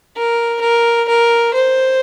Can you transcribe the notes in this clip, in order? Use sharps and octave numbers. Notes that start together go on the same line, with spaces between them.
A#4
A#4
A#4
C5